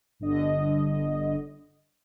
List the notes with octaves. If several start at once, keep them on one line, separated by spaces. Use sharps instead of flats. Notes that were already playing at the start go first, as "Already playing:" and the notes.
G1 D3 D#5